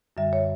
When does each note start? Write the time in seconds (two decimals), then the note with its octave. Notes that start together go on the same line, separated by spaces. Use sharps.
0.17 F#2 D3 G3 E5
0.33 C#5